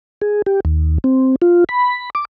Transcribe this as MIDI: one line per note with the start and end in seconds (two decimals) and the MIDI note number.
0.22 0.42 68
0.46 0.60 67
0.65 0.98 39
1.04 1.36 60
1.42 1.64 65
1.69 2.10 83
2.15 2.25 86